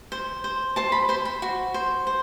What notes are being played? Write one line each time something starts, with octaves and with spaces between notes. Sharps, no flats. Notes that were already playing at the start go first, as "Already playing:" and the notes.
C5
C5
C5 A5
B5
C5 C6
B5
F#4
C5
C5